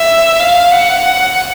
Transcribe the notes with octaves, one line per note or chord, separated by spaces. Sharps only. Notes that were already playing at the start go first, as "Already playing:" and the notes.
Already playing: E5
F5
F#5